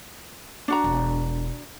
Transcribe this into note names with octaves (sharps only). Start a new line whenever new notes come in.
D4 F#4 A#5
E1